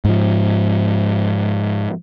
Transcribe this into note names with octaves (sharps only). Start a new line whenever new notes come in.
G#2 F3